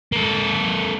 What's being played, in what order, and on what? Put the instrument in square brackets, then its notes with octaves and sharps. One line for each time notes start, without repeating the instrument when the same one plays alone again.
[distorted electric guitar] A#3 A4